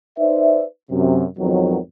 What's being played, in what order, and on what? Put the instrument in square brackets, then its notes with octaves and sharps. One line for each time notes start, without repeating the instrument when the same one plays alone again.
[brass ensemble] D#4 B4 C5 D5 E5
F#2 C3
G#1 F2 B2 D#3 F#3